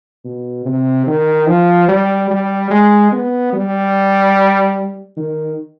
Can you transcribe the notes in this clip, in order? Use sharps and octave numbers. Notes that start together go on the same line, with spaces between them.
B2
C3
D#3
F3
G3
G3
G#3
B3
G3
D#3